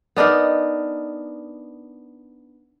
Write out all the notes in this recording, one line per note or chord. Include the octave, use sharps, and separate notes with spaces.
B3 D4 D#4 A#4